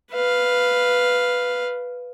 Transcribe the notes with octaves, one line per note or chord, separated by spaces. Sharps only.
B4 F5